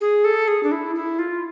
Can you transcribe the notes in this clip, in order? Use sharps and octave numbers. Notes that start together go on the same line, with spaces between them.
G#4
A4
G#4
D4
E4
E4
F4